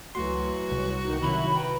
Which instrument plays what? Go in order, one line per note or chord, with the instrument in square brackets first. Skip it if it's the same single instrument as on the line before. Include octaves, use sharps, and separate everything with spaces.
[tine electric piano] C#2 A3 C6 [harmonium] E3 F#3 [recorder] F#4
[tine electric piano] C2
[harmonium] D#3 A#3 D#4
[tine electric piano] C3 D#3 [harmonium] F#3 E4 [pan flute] B5
[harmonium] B4 G5 A#5